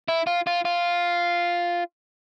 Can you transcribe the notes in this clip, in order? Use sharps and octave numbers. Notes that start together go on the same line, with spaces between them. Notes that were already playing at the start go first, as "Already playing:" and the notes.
E4
F4
F4
F4